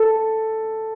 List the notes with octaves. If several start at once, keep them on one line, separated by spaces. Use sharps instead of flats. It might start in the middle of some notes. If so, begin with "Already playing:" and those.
Already playing: A4